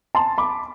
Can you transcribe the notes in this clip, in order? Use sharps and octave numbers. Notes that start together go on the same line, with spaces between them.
A5 C6
B5 D6